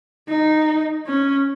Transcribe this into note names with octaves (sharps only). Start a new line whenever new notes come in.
D#4
C#4